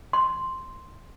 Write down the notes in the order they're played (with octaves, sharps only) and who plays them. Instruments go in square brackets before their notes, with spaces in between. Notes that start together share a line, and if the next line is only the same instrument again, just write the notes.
[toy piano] C6